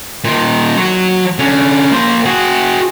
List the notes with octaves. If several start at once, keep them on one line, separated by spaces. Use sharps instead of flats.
A#2 D#3
F#3 C#5
D3 C#4
A#3 C5
F#4 G#4